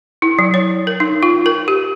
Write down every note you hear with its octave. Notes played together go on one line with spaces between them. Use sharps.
E4
F#3
C#5
A#4
D#4
F4
A#4
G4